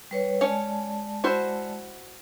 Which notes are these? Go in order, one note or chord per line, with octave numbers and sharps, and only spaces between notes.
G3 B4 C#5
G#3 C#4 C#5 D5 A5
E4 F#4 C5